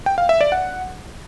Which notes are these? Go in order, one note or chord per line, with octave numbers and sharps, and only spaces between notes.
G5
F5
E5
D5
F#5